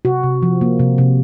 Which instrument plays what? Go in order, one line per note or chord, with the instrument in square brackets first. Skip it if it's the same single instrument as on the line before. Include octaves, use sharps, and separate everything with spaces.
[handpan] C3 F#4
C3
F3
A#3
C3
C3